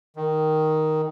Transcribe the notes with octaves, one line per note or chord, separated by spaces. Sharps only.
D#3